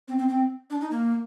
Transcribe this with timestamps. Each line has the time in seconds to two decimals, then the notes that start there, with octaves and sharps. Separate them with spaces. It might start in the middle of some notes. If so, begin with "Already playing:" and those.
0.08 C4
0.18 C4
0.29 C4
0.70 D4
0.81 D#4
0.91 A#3